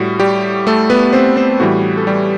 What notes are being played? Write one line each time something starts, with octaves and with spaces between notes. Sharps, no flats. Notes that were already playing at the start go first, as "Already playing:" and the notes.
Already playing: A2 G3 F#4
G3 G4
A3 A4
B3 B4
C4 C5
C4 C5
A2 E3 G3 F#4
A4
G3 G4